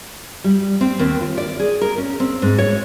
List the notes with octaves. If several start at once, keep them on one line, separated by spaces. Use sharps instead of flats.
G3
C4
D#2
F4
D5
G#4
A#4
C#4
C4
G#2
C#5